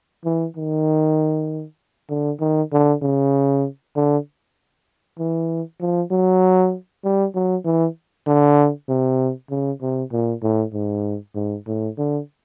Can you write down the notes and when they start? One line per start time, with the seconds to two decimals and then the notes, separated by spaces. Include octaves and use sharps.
0.25 E3
0.57 D#3
2.10 D3
2.40 D#3
2.73 D3
3.02 C#3
3.96 D3
5.19 E3
5.80 F3
6.11 F#3
7.04 G3
7.35 F#3
7.65 E3
8.27 D3
8.89 C3
9.50 C#3
9.82 C3
10.12 A#2
10.43 A2
10.74 G#2
11.35 G#2
11.67 A2
11.98 D3